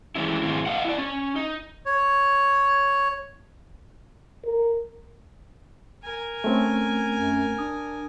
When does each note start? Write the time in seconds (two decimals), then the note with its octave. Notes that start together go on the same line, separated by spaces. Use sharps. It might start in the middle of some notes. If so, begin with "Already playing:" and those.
0.15 E3 G#3 C#4 E4
0.43 G#2 D#3 F3 G#3 C4 E4
0.66 D#5 F5 F#5
0.85 E4 D5
0.98 C#4
1.36 D#4
1.86 C#5
4.45 A#4
6.03 A#4 G#5
6.44 A3 C4 C#4
7.17 F#2
7.59 D4 D#6